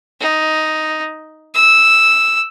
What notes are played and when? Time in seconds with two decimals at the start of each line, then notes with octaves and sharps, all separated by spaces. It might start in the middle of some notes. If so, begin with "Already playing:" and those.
0.20 D#4
1.55 E6